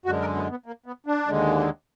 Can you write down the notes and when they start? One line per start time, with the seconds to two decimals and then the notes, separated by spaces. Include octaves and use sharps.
0.05 F#2 D3 G#3 F#4
0.21 A#4
0.36 B3
0.50 B3
0.66 A#3
0.86 B3
1.06 D4
1.27 D#2 D3 G#3